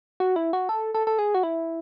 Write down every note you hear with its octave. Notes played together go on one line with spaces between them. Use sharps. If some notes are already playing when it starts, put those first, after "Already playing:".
F#4
E4
F#4
A4
A4
A4
G#4
F#4
E4